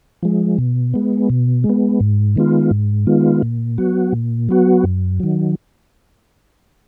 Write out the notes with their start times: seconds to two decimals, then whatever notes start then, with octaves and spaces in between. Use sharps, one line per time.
0.23 F3 G#3
0.58 B2
0.94 G#3 B3
1.30 B2
1.64 G#3
1.69 B3
2.00 G#2
2.36 D#3 G#3 B3 F4
2.71 G#2
3.07 D#3 G#3 B3 F4
3.42 A#2
3.78 F#3 B3 F#4
4.13 A#2
4.49 F#3 B3 F#4
4.84 F#2
5.20 D#3 F#3